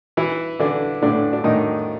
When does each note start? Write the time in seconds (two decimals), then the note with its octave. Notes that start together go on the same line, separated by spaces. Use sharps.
0.17 E3 E4
0.59 D3 E3 D4
1.02 A2 D3 D4
1.33 D4
1.44 A2 D#3 D#4